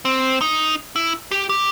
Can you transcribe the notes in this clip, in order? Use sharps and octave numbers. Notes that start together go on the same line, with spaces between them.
C4
D#4
E4
G4
G4